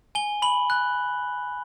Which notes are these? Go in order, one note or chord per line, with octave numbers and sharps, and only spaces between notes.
G#5 G7
B5 F#7
F#6